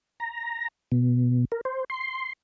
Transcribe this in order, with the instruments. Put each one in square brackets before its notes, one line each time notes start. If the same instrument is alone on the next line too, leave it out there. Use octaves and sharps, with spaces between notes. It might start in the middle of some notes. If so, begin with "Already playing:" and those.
[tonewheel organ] A#5
B2
A#4
C5
C6